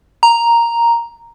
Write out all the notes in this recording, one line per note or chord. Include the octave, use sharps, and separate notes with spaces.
A#5